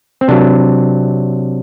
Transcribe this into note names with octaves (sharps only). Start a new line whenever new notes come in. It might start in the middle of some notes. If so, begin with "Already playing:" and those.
C4
C3 F#3 D4